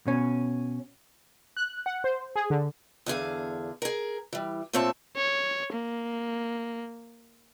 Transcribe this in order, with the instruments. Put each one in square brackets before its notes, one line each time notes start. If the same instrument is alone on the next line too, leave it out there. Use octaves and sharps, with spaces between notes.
[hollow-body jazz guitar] B2 C#4
[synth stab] F#6
F#5
C5
G#4
D3
[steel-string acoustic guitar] E2 D3 G#4 F5
G#4 A#4
E3 G3
A#2 A3 C4 C#5 E5 A5
[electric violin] C#5
A#3